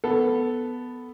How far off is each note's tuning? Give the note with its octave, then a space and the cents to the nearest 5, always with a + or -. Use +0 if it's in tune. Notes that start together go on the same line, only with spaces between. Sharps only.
B3 +5 A4 +0